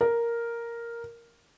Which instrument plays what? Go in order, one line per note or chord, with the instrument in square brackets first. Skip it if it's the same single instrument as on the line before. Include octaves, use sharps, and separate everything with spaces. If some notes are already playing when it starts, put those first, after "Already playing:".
[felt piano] A#4